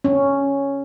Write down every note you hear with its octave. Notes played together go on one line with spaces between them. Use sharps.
C#4